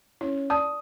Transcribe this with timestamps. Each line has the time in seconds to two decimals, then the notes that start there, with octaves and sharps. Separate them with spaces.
0.21 C#4 E4
0.50 D5 A5 D#6